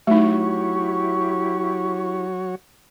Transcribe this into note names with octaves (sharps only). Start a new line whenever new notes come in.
F#3 A3 D#4 E4 F#4 G4 C#5 C#6